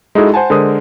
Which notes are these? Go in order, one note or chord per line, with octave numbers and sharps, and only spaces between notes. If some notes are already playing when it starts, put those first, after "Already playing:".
G#3 D#4 E4 F#4 G#4 A4
C5 F#5 G#5 A5
D3 G#3 A#4 C5 D#6